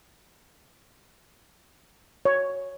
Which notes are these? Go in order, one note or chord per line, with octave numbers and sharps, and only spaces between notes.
C#5